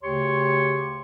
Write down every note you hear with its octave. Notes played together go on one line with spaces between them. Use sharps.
D2 C#3 G4 C#5 C6 C#6